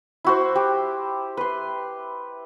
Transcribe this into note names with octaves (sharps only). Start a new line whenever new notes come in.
E4 F#4 C5
G4
B4 C6